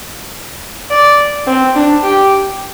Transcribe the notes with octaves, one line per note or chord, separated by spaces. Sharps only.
D5
C4
D4
G4